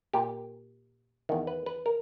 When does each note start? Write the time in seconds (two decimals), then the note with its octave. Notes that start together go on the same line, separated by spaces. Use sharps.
0.13 A#2 G4
1.29 E2 D#3
1.47 B4
1.66 B4
1.86 A#4